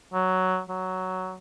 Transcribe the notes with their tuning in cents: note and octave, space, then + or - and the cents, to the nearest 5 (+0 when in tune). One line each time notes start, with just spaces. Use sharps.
F#3 +5
F#3 +5